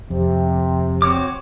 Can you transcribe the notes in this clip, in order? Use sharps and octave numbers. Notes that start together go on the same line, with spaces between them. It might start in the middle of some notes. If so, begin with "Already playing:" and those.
F2 C3
C4 F#4 C#5 D6